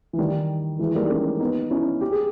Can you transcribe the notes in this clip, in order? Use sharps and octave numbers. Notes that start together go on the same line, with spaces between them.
E3
D#3 G3
E3 G#3
G3 A#3
D#4
A#3 C#4
B3 D#4
C#4 E4
G4
G#4